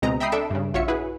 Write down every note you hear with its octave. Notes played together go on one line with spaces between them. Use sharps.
C#2 B2 G#3 C4 D#5 A#5
E5 G5 A#5 B5 D#6 C7
D4 A4 E5 D7 E7
G2 C#3
A#1 F4 F#4 C#5 E5 C#7
E4 F#4 G#4 B4